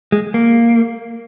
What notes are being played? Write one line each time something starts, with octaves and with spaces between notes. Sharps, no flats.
G#3
A#3